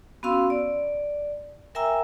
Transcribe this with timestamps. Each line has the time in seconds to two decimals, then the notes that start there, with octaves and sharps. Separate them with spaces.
0.23 B3 C#4 F#4 F5 C6 E6
0.50 D5
1.75 A#4 E5 G5 G#5 A#5 E6